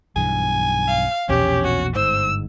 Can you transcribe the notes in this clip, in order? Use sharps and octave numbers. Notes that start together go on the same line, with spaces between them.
B1 G2 E3 G#5
F5
A#1 E2 B2 C#4 G4
F#4
G1 G#2 C5 E6